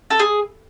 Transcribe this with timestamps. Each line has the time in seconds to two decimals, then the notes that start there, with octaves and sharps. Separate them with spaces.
0.10 A4
0.19 G#4